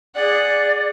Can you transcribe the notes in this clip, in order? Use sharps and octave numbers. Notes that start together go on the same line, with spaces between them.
G#4 D5 F#5